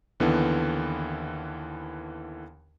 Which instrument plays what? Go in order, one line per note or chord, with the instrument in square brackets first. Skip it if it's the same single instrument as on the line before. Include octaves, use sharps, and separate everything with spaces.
[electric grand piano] D#2 D3 E3 B3